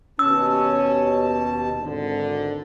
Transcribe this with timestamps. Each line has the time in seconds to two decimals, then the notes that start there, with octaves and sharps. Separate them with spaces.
0.19 D#2 B2 C#4 A5 E6
1.82 G#1 D3